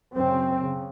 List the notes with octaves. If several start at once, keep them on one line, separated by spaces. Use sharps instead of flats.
F#2 C#3 C4
C#3